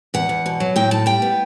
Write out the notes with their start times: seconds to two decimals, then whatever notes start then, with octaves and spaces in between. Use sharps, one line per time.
0.14 E2 F#5
0.29 E2
0.46 B2
0.60 F#3
0.76 A2 G5
0.91 A2 A5
1.06 G3 G5
1.22 B3